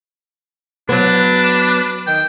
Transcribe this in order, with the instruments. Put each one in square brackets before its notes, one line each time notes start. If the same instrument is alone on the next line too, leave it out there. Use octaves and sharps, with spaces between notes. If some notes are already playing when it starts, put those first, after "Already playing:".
[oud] F#3 B3 [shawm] D4 [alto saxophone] B4
[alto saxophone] D#3 [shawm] G5